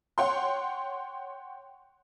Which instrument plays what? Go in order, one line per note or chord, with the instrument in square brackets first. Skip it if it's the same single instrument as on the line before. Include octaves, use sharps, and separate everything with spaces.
[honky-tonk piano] C#5 F#5 G5 C6